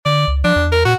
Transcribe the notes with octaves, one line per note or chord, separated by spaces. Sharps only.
D3 D5
C#2
F3 D4
E2
A#4
A#2 F#4